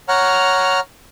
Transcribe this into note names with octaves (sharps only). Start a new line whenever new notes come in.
C#5 F#5 A#5 F6